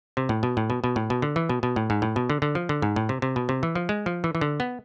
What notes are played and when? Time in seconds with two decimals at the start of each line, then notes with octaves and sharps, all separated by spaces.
0.17 C3
0.29 A2
0.43 B2
0.57 A2
0.70 B2
0.84 B2
0.96 A2
1.10 B2
1.22 D3
1.36 E3
1.49 B2
1.63 B2
1.76 A2
1.90 G#2
2.02 A2
2.16 B2
2.30 D3
2.42 D3
2.55 F3
2.69 D3
2.82 G#2
2.96 A2
3.09 C3
3.22 C3
3.36 B2
3.49 C3
3.63 E3
3.75 F3
3.89 G#3
4.06 F3
4.24 E3
4.35 E3
4.41 D3
4.60 B3